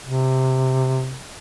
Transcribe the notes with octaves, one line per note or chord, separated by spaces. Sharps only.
C3